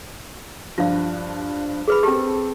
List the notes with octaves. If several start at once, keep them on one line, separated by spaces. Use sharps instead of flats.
G2 F3 F4 F5
G#4 B4 B5
C4 G4 A4